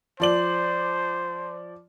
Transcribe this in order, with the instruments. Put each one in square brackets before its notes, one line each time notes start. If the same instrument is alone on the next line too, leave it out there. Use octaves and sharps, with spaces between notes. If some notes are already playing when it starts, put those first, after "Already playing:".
[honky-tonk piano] F3 D5 F#7 [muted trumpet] C5